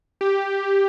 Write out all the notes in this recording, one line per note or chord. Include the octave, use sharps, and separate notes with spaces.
G4